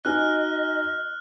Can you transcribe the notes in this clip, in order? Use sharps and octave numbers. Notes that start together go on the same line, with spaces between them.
D#4 F#4 D#5 G#5 F6 F#6